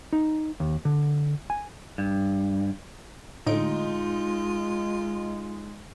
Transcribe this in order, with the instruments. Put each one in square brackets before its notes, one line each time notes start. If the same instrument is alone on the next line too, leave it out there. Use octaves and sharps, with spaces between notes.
[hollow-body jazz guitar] D#4
D#2
D3
G#5
[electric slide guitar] G2
[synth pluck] A2 D3 D7 [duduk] G#3 [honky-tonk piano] D#4 [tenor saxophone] F4